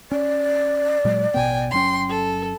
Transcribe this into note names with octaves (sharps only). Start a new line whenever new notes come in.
C#4 D5
A#2 F#3 G#3
A1 B2 B3 G5 G#5
G1 F#3 C#4 G5 C6
A4